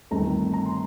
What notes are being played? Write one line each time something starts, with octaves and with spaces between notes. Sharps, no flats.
G1 G2 D#3 A3 C4 A#5
A#5
C6